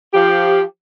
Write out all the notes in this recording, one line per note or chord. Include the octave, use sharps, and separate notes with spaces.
F3 G4